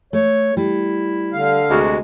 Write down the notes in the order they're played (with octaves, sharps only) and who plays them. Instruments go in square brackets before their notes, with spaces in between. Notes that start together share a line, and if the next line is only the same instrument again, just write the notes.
[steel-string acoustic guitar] A3 [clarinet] C#5
[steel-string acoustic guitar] G3 [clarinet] E4
[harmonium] D3 F5
[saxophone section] D2 C3 G#3 [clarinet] F#4